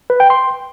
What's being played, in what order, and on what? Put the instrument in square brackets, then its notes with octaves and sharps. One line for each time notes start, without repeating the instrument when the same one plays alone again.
[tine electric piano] B4
G5
C6